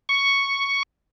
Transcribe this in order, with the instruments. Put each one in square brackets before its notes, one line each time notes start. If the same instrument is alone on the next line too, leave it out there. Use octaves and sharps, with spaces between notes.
[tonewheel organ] C#6